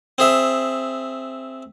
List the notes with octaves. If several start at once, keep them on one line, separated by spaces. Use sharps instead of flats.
C4 G#4 E5